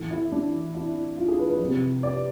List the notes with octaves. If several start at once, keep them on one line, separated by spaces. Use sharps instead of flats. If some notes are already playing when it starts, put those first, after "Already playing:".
Already playing: A2 E3
E4
D4
E4
F4
G#4
B4
B4
F3
C3
D5